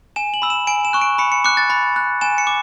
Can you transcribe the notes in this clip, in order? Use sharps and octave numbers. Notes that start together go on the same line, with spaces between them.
G#5 E7
F#7
B5 E6
E7
G#5 D7
E7
C#6 F#6
D7
B5 C#7
C#7
D6 F#6 C#7
A6
B5 A6
F#6
G#5 E7
C#7
D6